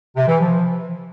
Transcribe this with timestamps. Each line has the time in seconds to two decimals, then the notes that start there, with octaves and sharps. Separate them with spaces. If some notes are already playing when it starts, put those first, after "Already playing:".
0.16 C3
0.28 E3
0.40 F3